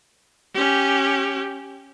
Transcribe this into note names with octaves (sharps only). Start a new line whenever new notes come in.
C#4 G4